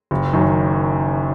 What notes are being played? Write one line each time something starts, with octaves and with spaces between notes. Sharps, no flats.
F#1
F#2 D#3